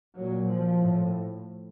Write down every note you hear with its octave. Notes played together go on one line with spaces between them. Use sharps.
A#2 F#3
F3
A2